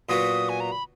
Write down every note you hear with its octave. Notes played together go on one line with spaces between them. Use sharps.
A#2 F#3 B3 F#4 D#6
G#5
A#5
B5